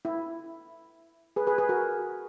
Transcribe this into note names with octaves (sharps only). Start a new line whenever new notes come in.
E4
G#4 B4
G#4 B4
G#4 B4
F#4 A#4